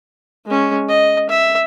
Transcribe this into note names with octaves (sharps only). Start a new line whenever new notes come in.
G#3 C#4
D#5
E5